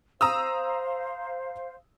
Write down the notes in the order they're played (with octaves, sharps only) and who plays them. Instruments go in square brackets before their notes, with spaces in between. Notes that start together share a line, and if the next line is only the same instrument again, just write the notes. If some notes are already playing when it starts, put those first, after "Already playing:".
[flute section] C5 F5 [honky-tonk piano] A#5 D#6 E6